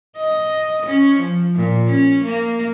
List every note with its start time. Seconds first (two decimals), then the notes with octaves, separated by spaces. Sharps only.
0.17 D#5
0.86 C#4
1.19 F3
1.55 A#2
1.90 C#4
2.24 A#3